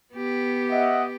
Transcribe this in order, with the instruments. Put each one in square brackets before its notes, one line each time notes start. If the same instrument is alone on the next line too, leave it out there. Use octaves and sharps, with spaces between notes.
[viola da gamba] B3 G4
[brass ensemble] D#5 E5 F#5